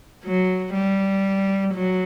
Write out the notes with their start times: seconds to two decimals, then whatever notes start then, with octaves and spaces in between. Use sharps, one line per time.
0.24 F#3
0.74 G3
1.74 F#3